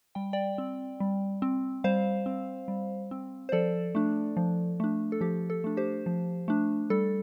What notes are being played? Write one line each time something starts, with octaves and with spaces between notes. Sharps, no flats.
G3 G5
D5 G5
C4
G3
C4
G3 C5 F5
C4
G3
C4
C5
F3 A4 D5
A3 D4
F3
A3 D4
A4
F3 G4
A4
A3 D4
G4 C5
F3
A3 D4
G3 A4